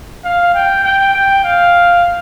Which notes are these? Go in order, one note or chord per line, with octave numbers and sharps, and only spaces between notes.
F5
G5
G5
G5
F5